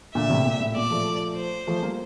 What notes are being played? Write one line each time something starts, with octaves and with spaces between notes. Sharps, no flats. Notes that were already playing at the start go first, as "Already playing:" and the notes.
A#2 D3 E5
A2 C3
A#2
A2
A#2 D5
F3 A3
C5
F3 A3
G3 A#3